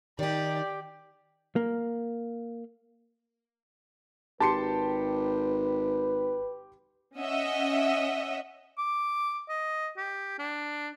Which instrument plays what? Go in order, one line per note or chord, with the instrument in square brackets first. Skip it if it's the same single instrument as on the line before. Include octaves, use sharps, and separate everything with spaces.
[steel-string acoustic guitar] D#3 D#4 [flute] G4 [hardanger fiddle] D5
[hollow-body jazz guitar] A#3
[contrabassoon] G#1 [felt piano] G4 C6 C#7 [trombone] B4 [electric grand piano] A5
[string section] C#4 D#5 E5 F#5
[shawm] D6
D#5
G4
D4